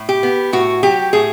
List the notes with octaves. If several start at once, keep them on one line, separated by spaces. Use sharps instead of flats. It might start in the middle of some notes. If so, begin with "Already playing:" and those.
Already playing: A2
G4
B3
A2 F#4
F#3 G4
A2 G#4